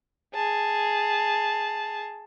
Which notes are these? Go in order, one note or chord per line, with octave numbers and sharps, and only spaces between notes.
G#4 A5